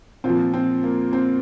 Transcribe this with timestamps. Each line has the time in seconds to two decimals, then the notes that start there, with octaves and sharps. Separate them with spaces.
0.24 A#2 F3 C4
0.54 C4
0.83 A#3
1.13 C4